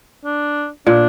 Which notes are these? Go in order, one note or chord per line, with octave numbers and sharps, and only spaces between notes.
D4
A#2 D4